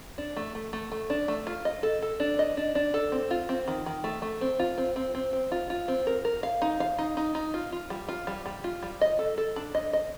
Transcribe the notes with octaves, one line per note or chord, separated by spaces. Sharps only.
D4
A3
A3
A3
A3
D4
A3
F4
D#5
A4
A4
D4
D#5
D4
D4
A4
C4
F4
C4
D#3
D#3
A3
A3
C4
F4
C4
C4
C4
C4
F4
F4
C4
A#4
A#4
F5
D#4
F5
D#4
D#4
D#4
F4
F4
G3
F4
G3
G3
F4
G3
D#5
A4
A4
D4
D#5
D#5